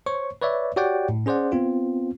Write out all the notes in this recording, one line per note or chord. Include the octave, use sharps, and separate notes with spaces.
C5 C#5 C#6
B4 C#5 D5 E5
F#4 G4 C#5 D5 F#5 G5
A2
C#4 G#4 C5 D5 F#5
B3 C4 F4